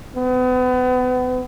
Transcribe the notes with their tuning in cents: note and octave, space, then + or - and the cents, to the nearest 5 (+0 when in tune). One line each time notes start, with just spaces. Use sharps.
B3 +35